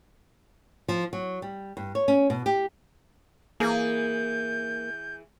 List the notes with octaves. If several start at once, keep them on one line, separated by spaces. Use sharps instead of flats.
F3
F#3
G3
G2
C#5
C#4
B2
G4
E3 A#3 G#4 G6